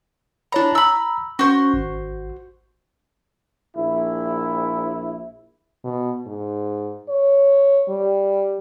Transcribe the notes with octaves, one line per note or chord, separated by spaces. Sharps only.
D4 E4 C#5 A#5 B5
A#5 B5 E6
C#4 F#4 C5 C#6
G#1
A#1 E4
B2
G#2
C#5
G3